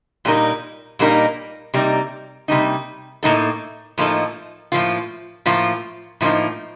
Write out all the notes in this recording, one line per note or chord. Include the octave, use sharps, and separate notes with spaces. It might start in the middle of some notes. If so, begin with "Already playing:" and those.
A#2 G3 A#3 D#4 A#4
A#2 G3 A#3 D#4 A#4
C3 G3 A#3 D#4
C3 G3 A#3 D#4
A2 F3 A#3 D#4 A4
A2 F3 A#3 D#4 A4
A2 F3 A#3 F4
A2 F3 A#3 F4
A2 F3 A#3 D#4